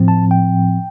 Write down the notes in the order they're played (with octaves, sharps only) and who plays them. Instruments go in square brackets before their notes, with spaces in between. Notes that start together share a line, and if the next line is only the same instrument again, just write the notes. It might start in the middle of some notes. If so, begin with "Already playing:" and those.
Already playing: [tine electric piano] A2 F3 C4
A5
G5